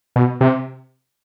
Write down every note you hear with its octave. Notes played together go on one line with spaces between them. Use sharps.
B2
C3